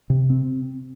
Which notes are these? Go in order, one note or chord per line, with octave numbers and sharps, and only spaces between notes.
C3
C4